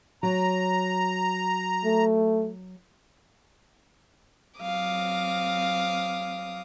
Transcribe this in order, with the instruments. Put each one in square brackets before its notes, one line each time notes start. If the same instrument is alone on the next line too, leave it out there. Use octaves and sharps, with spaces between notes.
[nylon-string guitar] F#3 [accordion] A#5
[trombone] A3
[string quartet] F#3 C4 F5 D6 D#6